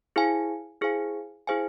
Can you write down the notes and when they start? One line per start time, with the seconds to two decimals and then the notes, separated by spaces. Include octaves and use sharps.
0.16 E4 G#4 C5 F5 G#5
0.81 E4 G#4 C5 F5 G#5
1.47 E4 G#4 C5 F5 G#5